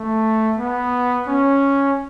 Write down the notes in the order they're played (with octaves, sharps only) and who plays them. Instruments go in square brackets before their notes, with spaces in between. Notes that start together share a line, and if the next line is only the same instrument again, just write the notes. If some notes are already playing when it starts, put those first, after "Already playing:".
Already playing: [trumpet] A3
B3
C#4